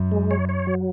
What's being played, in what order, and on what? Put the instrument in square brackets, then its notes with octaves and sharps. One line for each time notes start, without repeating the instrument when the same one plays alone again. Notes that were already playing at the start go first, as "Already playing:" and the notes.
Already playing: [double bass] F#2
[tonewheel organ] G#3
C#5
C#5
F#3